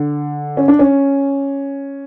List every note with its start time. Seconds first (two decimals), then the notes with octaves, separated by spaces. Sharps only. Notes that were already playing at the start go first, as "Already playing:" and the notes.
Already playing: D3
0.57 C#4
0.68 D4
0.79 C#4